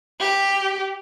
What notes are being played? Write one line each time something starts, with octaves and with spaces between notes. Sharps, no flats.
G4